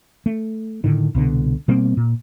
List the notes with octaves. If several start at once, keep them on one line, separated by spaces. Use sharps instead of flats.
A3
A2 D3 D#3
C2 B2 D3
B2 G3 A#3 C4
A#2